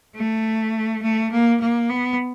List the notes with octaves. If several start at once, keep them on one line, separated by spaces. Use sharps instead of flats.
A3
A3
A#3
A#3
B3